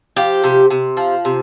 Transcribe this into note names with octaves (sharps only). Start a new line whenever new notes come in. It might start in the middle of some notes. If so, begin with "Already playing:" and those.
F3 G4
C3
C3
F3
C3